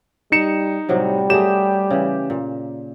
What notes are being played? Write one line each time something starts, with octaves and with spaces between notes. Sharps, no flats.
G3 D#4 C#7 E7
A2 C3 F#3 G3
F#3 A3 G4 G#4 E7
C#3 E3
A#2